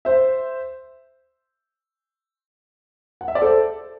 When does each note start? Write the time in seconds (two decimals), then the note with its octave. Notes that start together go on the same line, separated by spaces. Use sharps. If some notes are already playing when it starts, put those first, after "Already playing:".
0.05 C5 E5
3.21 F#5
3.28 E5
3.35 D5
3.42 A4 C5